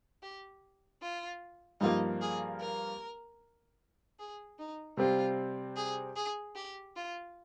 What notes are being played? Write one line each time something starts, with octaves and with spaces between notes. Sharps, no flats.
G4
F4
G2 F3 A#3 D#4
G#4
A#4
G#4
D#4
C3 G3 C4 F4
G#4
G#4
G4
F4